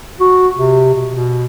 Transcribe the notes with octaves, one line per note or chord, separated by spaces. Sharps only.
F#4
C3
B2
B2